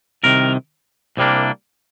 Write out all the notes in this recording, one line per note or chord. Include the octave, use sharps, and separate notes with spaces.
C2 C3 D#3 A#4
C2 C3 G3 A#3 D4